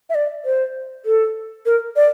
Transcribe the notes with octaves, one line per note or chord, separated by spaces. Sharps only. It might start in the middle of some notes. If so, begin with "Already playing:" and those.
E5
D5
C5
A4
A#4
D5